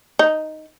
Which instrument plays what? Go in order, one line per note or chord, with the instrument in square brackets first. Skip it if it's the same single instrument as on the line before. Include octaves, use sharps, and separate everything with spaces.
[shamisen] D#4